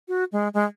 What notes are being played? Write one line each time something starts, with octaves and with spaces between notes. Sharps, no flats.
F#4
G#3
G#3